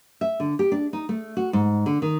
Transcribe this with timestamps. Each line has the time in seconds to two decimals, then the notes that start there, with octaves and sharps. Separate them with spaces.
0.21 E5
0.40 D3
0.59 G4
0.72 D4
0.93 D#4
1.09 A3
1.37 F#4
1.53 G#2
1.86 D3
2.02 D#3